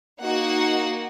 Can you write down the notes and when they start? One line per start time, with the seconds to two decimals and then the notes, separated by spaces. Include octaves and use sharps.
0.21 A#3 D#4 F#4 F#5